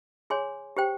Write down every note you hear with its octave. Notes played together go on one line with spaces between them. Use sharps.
G#4 C#5 G#5 C6
G4 C5 G5